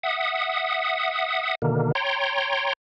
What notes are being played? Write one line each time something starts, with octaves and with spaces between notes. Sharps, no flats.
E5 F#5 D#6
B2 D3 D#3 A#3
C#5 G5 A#5 C6